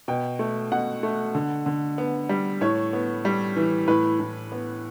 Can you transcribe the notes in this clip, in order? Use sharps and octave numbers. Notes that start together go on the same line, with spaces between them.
B2 G5
A3
B2 F#5
A3
D3
D3
B3
G3
A2 C#5
B3
G3
E3
A2 B4
A2
B3